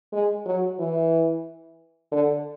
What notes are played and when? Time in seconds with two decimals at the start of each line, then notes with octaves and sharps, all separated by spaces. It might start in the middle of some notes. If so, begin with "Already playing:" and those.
0.13 G#3
0.46 F#3
0.79 E3
2.12 D3